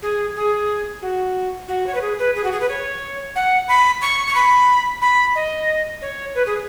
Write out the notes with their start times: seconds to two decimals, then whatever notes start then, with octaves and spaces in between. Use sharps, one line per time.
0.02 G#4
0.35 G#4
1.02 F#4
1.68 F#4
1.87 C#5
1.95 B4
2.01 G#4
2.19 B4
2.36 G#4
2.44 F#4
2.52 G#4
2.60 B4
2.69 C#5
3.36 F#5
3.68 B5
4.02 C#6
4.27 C#6
4.35 B5
5.02 B5
5.35 D#5
6.02 C#5
6.35 B4
6.46 G#4